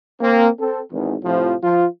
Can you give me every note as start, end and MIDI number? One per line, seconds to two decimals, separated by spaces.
0.21 0.48 58
0.21 0.48 60
0.60 0.80 60
0.60 0.80 69
0.92 1.14 32
0.92 1.14 40
1.24 1.55 45
1.24 1.55 48
1.24 1.55 53
1.63 1.86 53
1.63 1.86 65